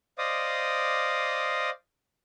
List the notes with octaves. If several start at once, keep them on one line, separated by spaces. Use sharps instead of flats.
C5 D5 D#5 F5 D6 D#6